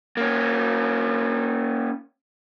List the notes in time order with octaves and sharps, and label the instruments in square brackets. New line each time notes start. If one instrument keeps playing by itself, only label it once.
[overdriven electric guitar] A#3 C#4